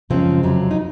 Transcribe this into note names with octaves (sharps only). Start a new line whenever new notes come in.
F#2 C#3 F3 G#3 C4
F2 C3 F#3
D#4